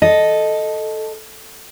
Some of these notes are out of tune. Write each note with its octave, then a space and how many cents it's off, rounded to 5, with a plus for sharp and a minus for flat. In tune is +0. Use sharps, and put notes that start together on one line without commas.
A4 -5 D#5 +0